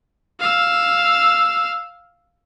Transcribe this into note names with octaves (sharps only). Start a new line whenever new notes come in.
F5 E6